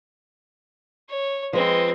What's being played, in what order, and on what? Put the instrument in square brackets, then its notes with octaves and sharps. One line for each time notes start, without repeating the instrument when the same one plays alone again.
[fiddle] C#5
[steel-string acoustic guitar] F3 B4 [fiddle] G#3 C4